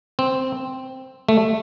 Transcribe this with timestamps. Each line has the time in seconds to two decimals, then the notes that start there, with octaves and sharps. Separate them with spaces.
0.19 C4
1.29 A3